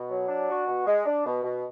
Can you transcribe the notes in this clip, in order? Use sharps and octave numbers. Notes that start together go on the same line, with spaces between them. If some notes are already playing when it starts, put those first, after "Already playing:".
Already playing: B2
F#3
D4
F#4
B2
G#3
D4
B2
B2